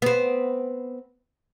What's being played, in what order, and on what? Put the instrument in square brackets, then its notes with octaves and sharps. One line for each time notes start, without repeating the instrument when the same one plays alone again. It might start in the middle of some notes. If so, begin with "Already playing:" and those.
[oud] B3 C4